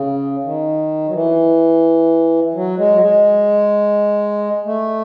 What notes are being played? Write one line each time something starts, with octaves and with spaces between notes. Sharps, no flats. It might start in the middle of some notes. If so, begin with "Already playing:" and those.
Already playing: C#3
D#3
F#3
E3
F#3
G#3
F#3
G#3
A3